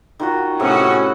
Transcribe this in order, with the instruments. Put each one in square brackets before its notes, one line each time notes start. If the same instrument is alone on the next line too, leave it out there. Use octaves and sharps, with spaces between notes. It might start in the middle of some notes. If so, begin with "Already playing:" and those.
[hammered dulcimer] D#3 F4 F#4
[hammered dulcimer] A2 C3 B3 [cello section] C#4 F#4